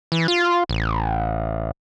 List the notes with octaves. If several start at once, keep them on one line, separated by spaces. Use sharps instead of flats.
E3
F4
A1